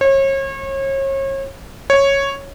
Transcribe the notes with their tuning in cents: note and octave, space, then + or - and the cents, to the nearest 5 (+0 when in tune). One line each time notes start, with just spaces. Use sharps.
C#5 -35
C#5 -5